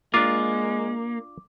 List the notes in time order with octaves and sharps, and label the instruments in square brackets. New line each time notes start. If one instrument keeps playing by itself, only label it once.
[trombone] G#3 [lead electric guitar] A#3 [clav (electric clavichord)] D4 F4 [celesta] D6